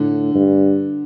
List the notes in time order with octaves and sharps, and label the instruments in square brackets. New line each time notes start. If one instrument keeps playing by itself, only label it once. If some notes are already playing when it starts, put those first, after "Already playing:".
Already playing: [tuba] A2 [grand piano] D3
[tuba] G2